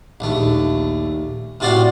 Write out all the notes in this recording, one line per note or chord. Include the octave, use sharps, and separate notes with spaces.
A#1 D#2 A3
A2 C3 F4 F#4 D5 F5